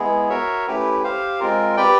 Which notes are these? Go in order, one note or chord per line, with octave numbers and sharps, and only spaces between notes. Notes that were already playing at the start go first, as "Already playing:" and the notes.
Already playing: G#3 B3 E4 G#4
F#4 A#4 C#5 E5
A3 C#4 E4 G4 B4
G4 C5 F5
G#3 C4 F4 A#4
G4 B4 D5 G5